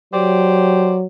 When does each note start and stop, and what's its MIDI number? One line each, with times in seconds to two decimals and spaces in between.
0.14 1.07 54
0.14 0.98 67
0.14 0.98 72
0.14 0.98 74